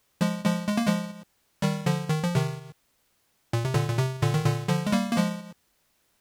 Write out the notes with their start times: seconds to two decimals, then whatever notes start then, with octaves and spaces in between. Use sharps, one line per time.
0.21 F3 G#3
0.45 F3 G#3
0.69 G#3
0.77 A#3
0.87 F3 G#3
1.62 D#3 G3
1.86 D3 F3
2.10 D#3
2.23 F3
2.35 C3 D#3
3.53 A#2
3.64 C3
3.74 A#2 D3
3.89 A#2
3.99 C3
4.22 A#2 D3
4.34 D#3
4.45 A#2 D3
4.69 D3 F3
4.87 G#3
4.92 G3 A#3
5.12 A#3
5.17 F3 G#3